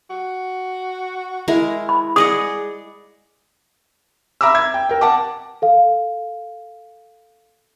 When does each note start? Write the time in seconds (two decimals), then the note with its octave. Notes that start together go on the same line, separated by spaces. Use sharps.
0.10 F#4
1.48 G#3 E4 A#4
1.89 B5
2.16 G#4 D5 D#5 F#5 D#6
4.41 E5 A#5 B5 D6 E6
4.55 G#6
4.74 G5
4.89 A#4 G5
5.01 F#5 A5 D6
5.62 A4 F5